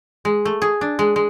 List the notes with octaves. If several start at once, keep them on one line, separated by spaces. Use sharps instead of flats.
G#3
A3
G#4
D4
G#3
G#3